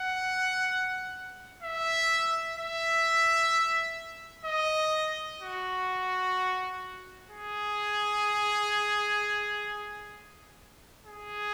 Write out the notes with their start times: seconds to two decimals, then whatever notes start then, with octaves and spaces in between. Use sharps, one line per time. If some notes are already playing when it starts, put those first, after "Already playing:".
Already playing: F#5
1.63 E5
2.57 E5
4.45 D#5
5.41 F#4
7.29 G#4
11.06 G#4